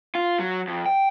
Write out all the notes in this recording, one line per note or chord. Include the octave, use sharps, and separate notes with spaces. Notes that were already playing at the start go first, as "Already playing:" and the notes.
F4
F#3
F2
G5